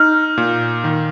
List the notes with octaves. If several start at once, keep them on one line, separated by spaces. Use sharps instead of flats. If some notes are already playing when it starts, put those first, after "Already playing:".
Already playing: D#4 F6
A#2
D#3